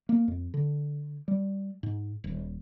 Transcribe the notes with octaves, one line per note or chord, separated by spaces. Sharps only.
A#3
F2
D3
G3
G#2
D#1